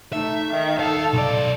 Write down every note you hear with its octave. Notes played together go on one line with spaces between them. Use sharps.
A3 D#4 E5
D#3
D#2 A4 F5
B1 D5